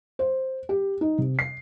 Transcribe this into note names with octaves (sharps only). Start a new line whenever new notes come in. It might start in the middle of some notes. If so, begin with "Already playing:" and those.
C5
G4
D#4
C3
C7